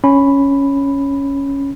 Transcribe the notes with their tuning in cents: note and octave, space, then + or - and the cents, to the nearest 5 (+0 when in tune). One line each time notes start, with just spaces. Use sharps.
C#4 +0 B5 +0